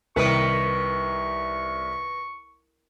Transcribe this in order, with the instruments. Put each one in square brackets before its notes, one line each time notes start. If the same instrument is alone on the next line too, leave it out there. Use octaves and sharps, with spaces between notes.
[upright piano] C2 D7 [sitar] D#3 B4 D#5 [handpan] A#4 [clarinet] C#6